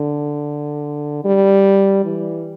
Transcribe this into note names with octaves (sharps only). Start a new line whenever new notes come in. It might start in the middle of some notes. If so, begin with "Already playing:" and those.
Already playing: D3
G3
E3